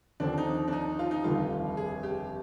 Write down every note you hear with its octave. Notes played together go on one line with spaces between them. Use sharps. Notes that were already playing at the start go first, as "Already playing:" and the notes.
D#2 D3 F3 C4 D4
D#4
D4
D#4
F4
D#4
F1 D#2 D3 G3 F4
G#4
G4